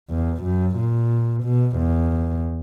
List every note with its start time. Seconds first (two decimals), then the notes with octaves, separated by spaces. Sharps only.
0.10 E2
0.43 F#2
0.77 A#2
1.44 B2
1.77 E2